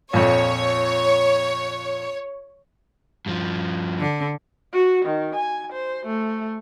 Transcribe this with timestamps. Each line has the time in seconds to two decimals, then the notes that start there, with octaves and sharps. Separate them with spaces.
0.13 A#1 F2 C#5
3.26 G2 F3
4.01 D3
4.74 F#4
5.05 D#3
5.35 G#5
5.73 C5
6.06 A3